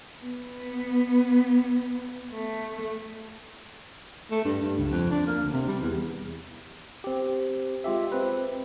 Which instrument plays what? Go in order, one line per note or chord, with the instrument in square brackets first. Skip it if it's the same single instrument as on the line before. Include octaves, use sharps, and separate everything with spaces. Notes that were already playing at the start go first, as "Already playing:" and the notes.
[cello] B3
A3
[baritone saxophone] A3
G2
G2
C#2
F2
D4
A#3
D2
C3
G3
E2
[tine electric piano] C4 G4
G#3 F4 G4 E5
C4 B4